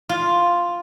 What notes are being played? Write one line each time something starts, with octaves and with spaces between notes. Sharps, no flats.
F4